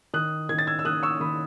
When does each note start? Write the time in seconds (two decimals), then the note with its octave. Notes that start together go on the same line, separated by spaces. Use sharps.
0.14 D#3 D#6 F#6
0.49 D#3 G#6
0.59 A6
0.67 E6 G#6
0.79 E6
0.85 D#3 D#6 F#6
1.03 C#6 E6
1.20 D#3 B5 D#6